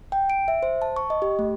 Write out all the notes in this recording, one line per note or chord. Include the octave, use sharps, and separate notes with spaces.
G5
D7
E5
C5
A5
C#6
D#5
G4
A3